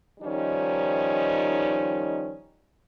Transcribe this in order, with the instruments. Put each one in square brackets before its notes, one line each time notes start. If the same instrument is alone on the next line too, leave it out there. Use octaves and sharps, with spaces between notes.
[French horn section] D#3 F3 G3 C#4 D#4